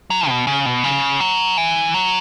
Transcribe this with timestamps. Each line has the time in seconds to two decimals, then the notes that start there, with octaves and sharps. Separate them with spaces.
0.10 F#3
0.28 B2
0.47 C#3
0.66 B2
0.84 C#3
1.20 F#3
1.57 E3
1.94 F#3